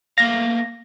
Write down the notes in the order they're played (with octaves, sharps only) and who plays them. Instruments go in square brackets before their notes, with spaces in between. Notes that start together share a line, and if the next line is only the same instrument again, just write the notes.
[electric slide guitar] A3 A#3 F5 [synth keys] A#6